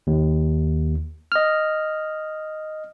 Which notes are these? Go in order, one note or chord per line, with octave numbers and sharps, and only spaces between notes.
D#2
D#5 F6